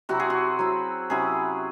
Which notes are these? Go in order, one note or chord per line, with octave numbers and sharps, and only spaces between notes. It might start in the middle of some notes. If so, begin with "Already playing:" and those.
C3 F#3 C4 E4 F#4
G#4
F#4
F#3 C4 E4
C3 F#3 C#4 E4 G#4